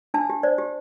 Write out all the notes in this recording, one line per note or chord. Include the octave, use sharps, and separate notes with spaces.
D4 A5
G4
C5 D5
G4